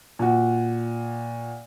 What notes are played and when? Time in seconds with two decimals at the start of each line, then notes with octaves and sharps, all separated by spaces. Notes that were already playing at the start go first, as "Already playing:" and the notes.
0.19 A#2 F#4